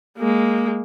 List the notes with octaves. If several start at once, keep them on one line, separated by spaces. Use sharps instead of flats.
G#3 A#3